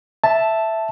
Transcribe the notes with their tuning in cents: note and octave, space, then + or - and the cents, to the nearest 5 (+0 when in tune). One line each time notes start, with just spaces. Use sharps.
E5 +0 A5 +0